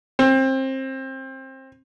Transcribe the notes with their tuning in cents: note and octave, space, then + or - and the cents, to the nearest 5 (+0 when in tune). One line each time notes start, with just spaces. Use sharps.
C4 +25